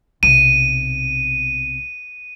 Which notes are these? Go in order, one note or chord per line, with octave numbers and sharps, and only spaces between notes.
B1 C3 D#7